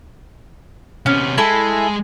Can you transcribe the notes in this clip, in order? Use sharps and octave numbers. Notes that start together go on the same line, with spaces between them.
C3 B3 C#4
G#3 E4 A4 G#5